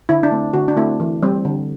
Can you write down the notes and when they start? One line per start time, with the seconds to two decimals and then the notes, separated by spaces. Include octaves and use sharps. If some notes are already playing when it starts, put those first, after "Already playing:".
0.09 D3 E4
0.23 D4
0.31 A3 C4
0.54 D3 F#4
0.68 D4
0.77 A3 C4 E4
1.00 E3
1.23 G3 C4
1.45 D3